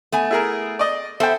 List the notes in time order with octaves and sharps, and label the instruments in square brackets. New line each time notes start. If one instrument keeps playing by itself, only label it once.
[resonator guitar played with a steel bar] A3 B3 G#5
[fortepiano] E4 G#4 A#4
D5 D#5
[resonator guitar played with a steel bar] B3 C5 E5 [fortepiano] A4 G5